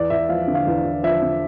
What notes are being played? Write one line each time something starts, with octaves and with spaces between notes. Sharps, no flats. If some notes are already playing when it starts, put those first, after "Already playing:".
Already playing: E2 D5
E2 E5
F3 F5
D3
F5
E2
E2
F3 E5
D3